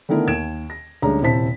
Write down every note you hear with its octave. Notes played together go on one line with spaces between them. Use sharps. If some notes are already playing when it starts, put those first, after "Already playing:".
D3 D#3 A3 B3 E4 A#4
D#2 G#6 D7 E7
A#6
D2 G3 G#3 C#4 A#5
D#1 C3 E4 C5 A5 B6